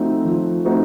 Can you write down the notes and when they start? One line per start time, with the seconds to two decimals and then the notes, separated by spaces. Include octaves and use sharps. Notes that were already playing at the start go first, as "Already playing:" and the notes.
Already playing: F3 A3 C4 D#4 F#4
0.25 F3
0.65 A3 C4 D#4 F#4